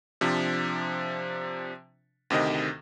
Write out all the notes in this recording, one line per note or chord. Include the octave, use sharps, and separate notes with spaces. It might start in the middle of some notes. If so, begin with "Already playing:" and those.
C3 F3 D4
D2 C3 D#3 D#5